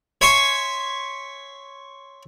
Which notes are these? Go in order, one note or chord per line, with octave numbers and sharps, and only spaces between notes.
C#5 E5 G#5 C6 C#6